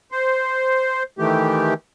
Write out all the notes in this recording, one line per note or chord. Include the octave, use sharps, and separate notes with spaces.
C5
D#3 E3 A3 G4